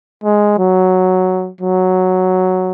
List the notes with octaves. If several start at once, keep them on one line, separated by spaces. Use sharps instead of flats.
G#3
F#3
F#3